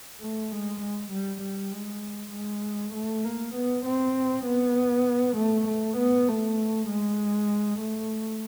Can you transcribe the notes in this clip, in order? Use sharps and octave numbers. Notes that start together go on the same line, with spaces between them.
A3
G#3
G#3
G3
G3
G#3
G#3
A3
A#3
B3
C4
B3
A3
A3
B3
A3
G#3
A3